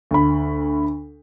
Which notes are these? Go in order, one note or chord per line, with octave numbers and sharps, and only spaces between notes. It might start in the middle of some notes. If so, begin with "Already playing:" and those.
D2 B5